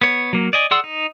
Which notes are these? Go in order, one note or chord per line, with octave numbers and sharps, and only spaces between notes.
B3 C#5
F#3 A#3
D5 D#5 G#5
G#4 D5 F#5 C6 E6
D#4